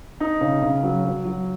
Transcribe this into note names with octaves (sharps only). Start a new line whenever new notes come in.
D#4
C#3
C#3
F#3
F#3
F#3